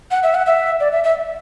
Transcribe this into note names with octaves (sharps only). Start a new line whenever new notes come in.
F#5
E5
F#5
E5
D5
E5
E5